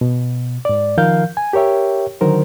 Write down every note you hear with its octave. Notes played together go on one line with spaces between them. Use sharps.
B2
G#2 D5
D#3 F3 A#4 F5 G6
G#5
G4 A#4 C#5 E5 G5
D3 D#3 F#3 A#4 C5